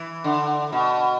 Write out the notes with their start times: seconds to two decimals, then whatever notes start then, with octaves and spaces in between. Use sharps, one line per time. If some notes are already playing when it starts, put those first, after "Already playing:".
Already playing: E3
0.24 D3
0.72 B2